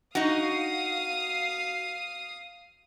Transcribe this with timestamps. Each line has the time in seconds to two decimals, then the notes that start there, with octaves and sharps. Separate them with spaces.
0.15 D#4 F#4 F5 D#6 C7